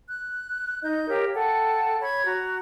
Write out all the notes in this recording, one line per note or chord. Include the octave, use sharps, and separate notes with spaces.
F#6
D#4 D#5 G6
G4 A#4 C#5 F5
A4 F#5 G5 A5
C#5 B5 G#6
F#4 A#5